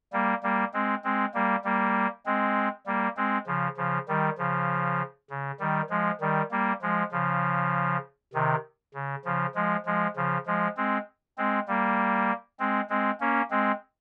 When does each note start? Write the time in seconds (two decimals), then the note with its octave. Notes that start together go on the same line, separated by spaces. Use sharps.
0.13 G3 A#3
0.43 G3 A#3
0.74 G#3 C4
1.04 G#3 C4
1.34 G3 A#3
1.64 G3 A#3
2.26 G#3 C4
2.86 G3 A#3
3.17 G#3 C4
3.47 C#3 F3
3.77 C#3 F3
4.08 D#3 G3
4.38 C#3 F3
5.30 C#3
5.60 D#3 G3
5.90 F3 G#3
6.21 D#3 G3
6.51 G3 A#3
6.82 F3 G#3
7.12 C#3 F3
8.34 C3 D#3
8.94 C#3
9.25 C#3 F3
9.55 F3 G#3
9.86 F3 G#3
10.16 C#3 F3
10.46 F3 G#3
10.77 G#3 C4
11.38 G#3 C4
11.68 G3 A#3
12.60 G#3 C4
12.90 G#3 C4
13.20 A#3 C#4
13.51 G#3 C4